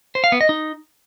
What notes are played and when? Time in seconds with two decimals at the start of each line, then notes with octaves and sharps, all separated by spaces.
0.15 C5
0.24 F5
0.32 B3
0.41 D#5
0.49 D#4